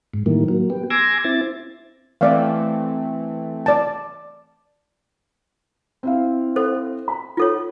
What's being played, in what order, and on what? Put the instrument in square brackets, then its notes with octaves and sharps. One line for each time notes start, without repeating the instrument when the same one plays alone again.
[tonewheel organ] G#2
A2 D#3 E3 G3 A#3
F#3 A#3
B3 G4
G#5 C6 D6 E6 G#6 A#6
C4 E4 A6
[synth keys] E3 A3 C4 [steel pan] D5 F5
[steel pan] D5 A5
[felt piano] C4 E4 F5
[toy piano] A4 C5
[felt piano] B5
[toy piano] F4 A4 C#5